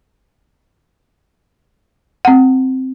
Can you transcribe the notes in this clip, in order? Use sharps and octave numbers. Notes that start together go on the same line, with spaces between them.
C4 F#5